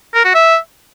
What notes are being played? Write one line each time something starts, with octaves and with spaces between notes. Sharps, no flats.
A#4
F#4
E5